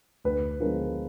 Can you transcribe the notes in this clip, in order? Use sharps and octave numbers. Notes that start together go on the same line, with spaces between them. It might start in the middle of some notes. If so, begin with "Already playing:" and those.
D2 B4
D3 F3 G#3 B3 A#4